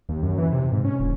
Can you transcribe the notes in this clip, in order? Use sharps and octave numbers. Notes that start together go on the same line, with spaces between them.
D#2
F#2
E3
C3
G#2
C#4
D#1